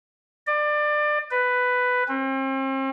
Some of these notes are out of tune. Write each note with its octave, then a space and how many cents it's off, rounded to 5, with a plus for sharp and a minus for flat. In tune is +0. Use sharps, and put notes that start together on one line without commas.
D5 +25
B4 +10
C4 +40